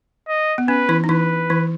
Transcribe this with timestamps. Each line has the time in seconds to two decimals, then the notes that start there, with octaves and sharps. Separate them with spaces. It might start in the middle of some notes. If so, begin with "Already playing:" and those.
0.28 D#5
0.58 B3
0.68 C#4 B4
0.89 E3 E4
1.04 D#4
1.09 E3 E4 B4
1.50 E3 E4